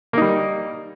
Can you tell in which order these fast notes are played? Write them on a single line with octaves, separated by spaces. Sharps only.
A#3 D#4 G3